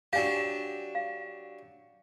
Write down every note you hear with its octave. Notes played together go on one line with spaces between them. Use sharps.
F#3 D4 G4 F5 G#5
F5